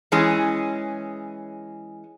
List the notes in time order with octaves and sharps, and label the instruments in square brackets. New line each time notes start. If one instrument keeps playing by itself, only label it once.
[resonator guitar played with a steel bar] E3 G#3 C#4 G#4